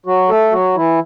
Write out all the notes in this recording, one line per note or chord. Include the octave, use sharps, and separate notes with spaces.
F#3 F#4
A3 A4
F#3 F#4
E3 E4